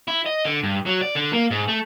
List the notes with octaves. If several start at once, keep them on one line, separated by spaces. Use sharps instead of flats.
E4
D#5
D3
G2
F#3
D5
D3
A#3
G#2
A3